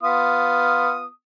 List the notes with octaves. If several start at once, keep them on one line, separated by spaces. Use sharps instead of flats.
B3 F4 D#6